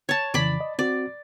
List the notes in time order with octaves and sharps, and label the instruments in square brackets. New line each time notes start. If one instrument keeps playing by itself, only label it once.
[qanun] C#5 A5
[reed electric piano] F2 C#3 E3 [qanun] D5 B5
[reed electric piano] D#5
[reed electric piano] C4 F#4 [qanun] D5